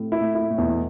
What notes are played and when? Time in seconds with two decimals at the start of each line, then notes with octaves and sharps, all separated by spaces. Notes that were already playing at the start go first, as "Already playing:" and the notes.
Already playing: A2 C3
0.12 E4
0.21 A2
0.35 E4
0.50 A2
0.58 E2 B2
0.67 A2